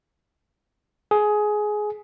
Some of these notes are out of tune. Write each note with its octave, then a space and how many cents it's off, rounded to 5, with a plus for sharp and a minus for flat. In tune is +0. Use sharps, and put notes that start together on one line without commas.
G#4 +15